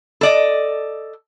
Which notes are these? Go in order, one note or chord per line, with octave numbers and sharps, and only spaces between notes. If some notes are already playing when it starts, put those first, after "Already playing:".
A4 D5 D#5